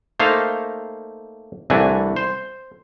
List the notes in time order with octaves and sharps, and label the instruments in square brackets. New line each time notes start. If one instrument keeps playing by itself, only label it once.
[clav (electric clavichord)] A3 A#3 D#4 C5 F5
C2 E3 A3 D4 G#5
C5